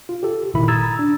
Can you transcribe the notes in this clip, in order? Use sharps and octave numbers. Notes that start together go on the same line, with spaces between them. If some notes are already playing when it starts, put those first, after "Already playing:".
F4
G4 A4
G1 A#2 D#3 E4 B5
A#5 D#6 E6 G#6 A6
D4